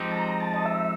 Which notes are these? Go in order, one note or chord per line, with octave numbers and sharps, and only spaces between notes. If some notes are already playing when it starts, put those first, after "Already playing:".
Already playing: F3 G#3 C4 D#4 G4
A5
A#5
A5
D#5
E5